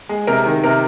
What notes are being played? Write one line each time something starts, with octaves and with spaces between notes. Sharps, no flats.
G#3
C3 A#4
D#3
C3 A#4